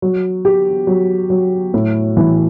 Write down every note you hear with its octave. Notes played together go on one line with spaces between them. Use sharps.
F#3
G4
F#3
F#3
A2
E3